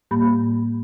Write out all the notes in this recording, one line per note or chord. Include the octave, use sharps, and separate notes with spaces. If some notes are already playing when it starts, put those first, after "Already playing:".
A2 G3 A#3 G4 B5